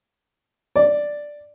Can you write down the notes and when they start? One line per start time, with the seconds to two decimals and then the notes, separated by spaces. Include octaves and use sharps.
0.76 D5